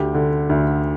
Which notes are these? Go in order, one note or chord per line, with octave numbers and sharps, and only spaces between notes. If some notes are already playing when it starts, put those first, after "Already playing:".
Already playing: D2 G4
D3
D2